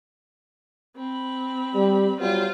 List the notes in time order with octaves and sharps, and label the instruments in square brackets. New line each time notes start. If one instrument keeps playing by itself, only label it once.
[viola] C4 B5
[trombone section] G3
[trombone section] F#3 G3 B3 [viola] F4 C5